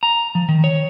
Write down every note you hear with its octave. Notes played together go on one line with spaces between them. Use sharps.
A#5
F3
D#3
C#5